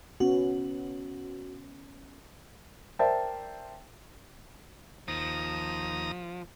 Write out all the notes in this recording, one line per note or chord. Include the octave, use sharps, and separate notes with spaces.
B3 C#4 F#4
A#4 C5 D5 E5 G5 A5
D#2 F3 A#5 D#6